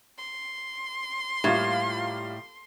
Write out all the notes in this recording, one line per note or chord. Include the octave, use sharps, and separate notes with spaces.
C6
A2 G3 A#3 F4